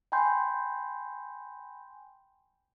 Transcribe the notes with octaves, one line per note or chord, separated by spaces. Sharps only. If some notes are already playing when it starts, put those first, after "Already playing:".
G5 G#5 B5 C6 G6